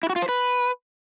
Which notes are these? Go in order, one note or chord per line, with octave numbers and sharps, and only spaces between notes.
E4
F#4
F4
C5
B4